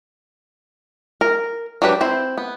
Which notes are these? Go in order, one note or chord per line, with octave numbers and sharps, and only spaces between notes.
A#4
F#3 D4 G4 B4
C4 E4 C5
B3